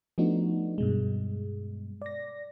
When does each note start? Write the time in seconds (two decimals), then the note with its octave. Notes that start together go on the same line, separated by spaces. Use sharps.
0.18 F3 A3 B3 D4 D#4 F#4
0.78 G2 B2 G#3
2.02 D5 A#6